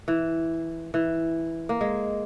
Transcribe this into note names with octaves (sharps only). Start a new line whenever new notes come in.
E3
E3
A#3
G#3